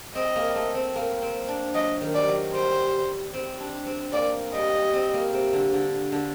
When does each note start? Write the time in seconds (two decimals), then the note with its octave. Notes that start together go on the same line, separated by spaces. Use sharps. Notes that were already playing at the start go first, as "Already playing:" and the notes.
0.15 C4 D#5
0.36 A#3
0.55 A3
0.75 C4
0.95 A#3
1.22 C4
1.48 D4
1.74 F#3 D#5
2.01 D#3
2.14 G3 D5
2.28 F#3
2.54 G3 C5
3.34 C4
3.60 D4
3.87 C4
4.13 A#3 D5
4.54 G3 D#5
4.93 C4
5.14 A#3
5.33 C3
5.53 D3
5.73 D3
6.12 D3